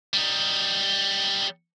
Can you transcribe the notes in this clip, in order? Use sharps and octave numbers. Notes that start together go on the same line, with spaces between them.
G3 D#4